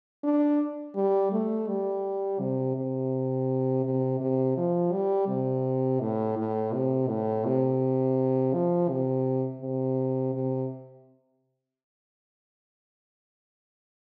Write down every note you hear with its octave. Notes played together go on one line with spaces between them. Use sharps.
D4
G3
A3
G3
C3
C3
C3
C3
F3
G3
C3
A2
A2
C3
A2
C3
F3
C3
C3
C3